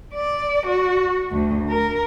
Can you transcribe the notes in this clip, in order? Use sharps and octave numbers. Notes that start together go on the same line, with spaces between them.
D5
F#4
D2
A#4